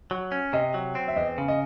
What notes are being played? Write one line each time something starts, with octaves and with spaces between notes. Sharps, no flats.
F#3
C#4
C3 D#5
F#3
C4
E5
E2 D#5
C#3
D#5